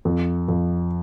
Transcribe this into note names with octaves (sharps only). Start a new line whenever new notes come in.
F2
F2